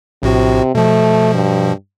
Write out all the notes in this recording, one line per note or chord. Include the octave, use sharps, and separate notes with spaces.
A#1 A2 C3 F#4
B2 F3 A3
G2